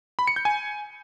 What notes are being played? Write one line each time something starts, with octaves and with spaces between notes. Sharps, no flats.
B5
C#7
G6
G#5